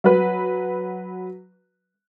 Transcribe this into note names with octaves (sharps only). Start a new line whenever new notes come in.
F#3 B4